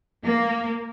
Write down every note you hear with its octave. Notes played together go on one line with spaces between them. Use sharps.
A#3